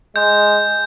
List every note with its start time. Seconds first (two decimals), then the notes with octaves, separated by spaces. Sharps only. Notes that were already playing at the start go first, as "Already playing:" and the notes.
0.16 G#3 G6